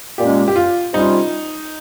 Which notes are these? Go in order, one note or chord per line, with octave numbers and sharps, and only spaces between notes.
A#2 G#3 C#4 G4
G4
F4
C3 G3 C#4 D#4 F4